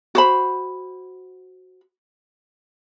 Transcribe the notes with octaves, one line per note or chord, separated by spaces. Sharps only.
F#4 C5 B5